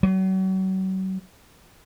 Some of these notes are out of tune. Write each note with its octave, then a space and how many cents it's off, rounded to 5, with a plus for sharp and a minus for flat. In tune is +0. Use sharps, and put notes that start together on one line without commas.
F#3 +40